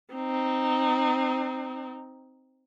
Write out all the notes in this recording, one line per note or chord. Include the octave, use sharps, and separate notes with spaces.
C4 D#4